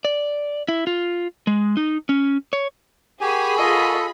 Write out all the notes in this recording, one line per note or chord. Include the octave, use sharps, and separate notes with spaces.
D5
E4
F4
G#3
D#4
C#4
C#5
G4 G#4 A#4 F#5 G#5 B5 C#6
F4 A4 D#5